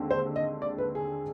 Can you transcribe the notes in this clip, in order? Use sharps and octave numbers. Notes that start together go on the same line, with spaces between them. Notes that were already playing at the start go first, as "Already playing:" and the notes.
Already playing: D#2 D3 G#3 C4
C5
D#5
D5
B4
G#4